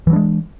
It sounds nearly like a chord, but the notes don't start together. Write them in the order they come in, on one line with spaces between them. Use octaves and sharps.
E3 F#3 D4 G#3